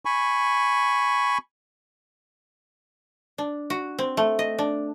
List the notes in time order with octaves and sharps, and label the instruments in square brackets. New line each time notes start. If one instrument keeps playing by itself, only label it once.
[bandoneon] G#5 B5 C#6
[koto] D4
F#4
C4
A3
D#5
D4